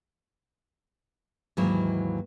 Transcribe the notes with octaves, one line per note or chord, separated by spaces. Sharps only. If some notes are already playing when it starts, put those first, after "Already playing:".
D#2 G#2 E3 F#3 A#3 E4